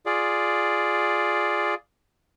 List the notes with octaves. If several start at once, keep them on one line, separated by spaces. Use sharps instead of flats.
F4 G#4 D5